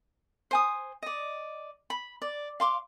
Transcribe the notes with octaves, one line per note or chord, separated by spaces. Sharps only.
C5 G#5 D#6
D5 D#5
B5
D5
F5 C6 D6